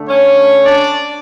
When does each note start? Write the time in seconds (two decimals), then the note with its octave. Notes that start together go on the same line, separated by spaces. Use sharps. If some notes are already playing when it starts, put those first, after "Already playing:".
Already playing: D3 A3 D4
0.09 C#4 C#5
0.64 D4 D5